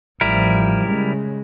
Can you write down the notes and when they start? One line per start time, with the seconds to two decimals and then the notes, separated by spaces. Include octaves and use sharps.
0.21 A1 F3 G3 E4 A#4
0.85 C#3 G#3